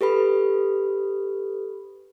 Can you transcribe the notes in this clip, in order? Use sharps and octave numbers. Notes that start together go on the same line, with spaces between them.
G4 A4 B4 B5